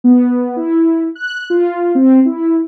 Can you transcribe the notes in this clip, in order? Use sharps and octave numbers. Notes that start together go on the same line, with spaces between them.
B3
E4
F#6
F4
C4
E4